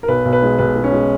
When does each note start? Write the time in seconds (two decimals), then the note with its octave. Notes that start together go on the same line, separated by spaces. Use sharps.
0.03 A#4
0.08 B1 B4
0.25 B1
0.33 B4
0.42 G#3
0.58 B1 B4
0.76 G#3
0.84 C#4
0.93 G#3